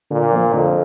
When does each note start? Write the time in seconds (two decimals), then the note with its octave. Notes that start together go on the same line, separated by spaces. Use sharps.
0.11 A#2 D3
0.32 F3 A#3
0.54 F2 D3